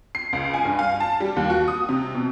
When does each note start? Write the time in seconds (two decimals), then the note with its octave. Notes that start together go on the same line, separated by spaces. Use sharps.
0.15 C7
0.33 C#2
0.54 G#5
0.65 G2
0.79 F5
1.00 A5
1.20 G3
1.36 D#2
1.50 F#4
1.68 D#6
1.89 C3
2.15 B2